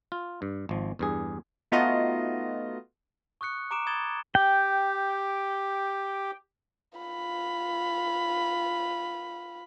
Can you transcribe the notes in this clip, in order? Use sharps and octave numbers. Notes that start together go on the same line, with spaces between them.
F4
G2
G#1 F3
E2 G2 G#4
A3 B3 D#4 F4 F#4 D#5
C#6 D#6 F#6 C#7
A#5 D6 D7 E7
B5 D#6 G#6 A6 E7 G7
G4 G5
F4 B5